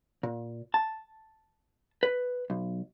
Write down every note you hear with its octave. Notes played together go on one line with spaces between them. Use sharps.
A#2
A5
B4
B1